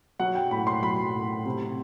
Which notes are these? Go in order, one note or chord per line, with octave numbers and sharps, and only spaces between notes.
F#3 F#5
G5
A2 B5
C6
F#3 B5
A2
C3